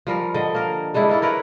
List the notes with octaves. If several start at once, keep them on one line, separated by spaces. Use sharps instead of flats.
F3 G3 A#4
D3 D#5
A#3 A#4
G3 G#3 D4 E4
A#3 E4 A4
E4 A#4 B4 C#5